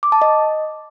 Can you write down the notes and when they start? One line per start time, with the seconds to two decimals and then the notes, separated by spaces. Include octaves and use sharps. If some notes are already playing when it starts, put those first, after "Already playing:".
0.03 D6
0.12 A5
0.22 D#5